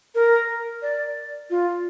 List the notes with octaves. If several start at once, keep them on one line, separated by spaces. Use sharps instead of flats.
A#4
D5
F4